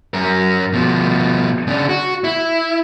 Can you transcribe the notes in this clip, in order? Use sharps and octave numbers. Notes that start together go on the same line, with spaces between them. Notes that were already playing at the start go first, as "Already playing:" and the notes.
F#2 A#4
B2 F3
C#3 D4
F#4
E4